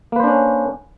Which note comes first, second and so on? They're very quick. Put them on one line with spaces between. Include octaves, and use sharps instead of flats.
A#3 B4 C5 D4 C#4